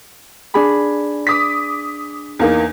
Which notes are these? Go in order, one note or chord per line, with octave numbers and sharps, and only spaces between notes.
D4 G#4 B5
D6 D#6 B6
E2 A#3 D#4